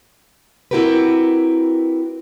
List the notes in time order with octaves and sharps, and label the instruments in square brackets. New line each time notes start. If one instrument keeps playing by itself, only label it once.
[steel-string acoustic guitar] C4 E4 F#4 G4 A#4 B4